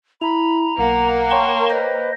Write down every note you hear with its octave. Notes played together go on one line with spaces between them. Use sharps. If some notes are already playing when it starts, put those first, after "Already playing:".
E4 A#5 B5
B1 A#3 F#5
C#5 G5 A5 C6 C#6
B4 C5 D#5